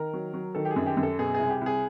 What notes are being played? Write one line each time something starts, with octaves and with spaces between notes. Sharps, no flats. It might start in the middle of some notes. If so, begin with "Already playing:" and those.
Already playing: D#3 A#4
F#3
F#3
D#3 A4
G4
G#4
F#2
G4
F#2
A4
B2 G#4
G#4
C2
G4
C2 G#4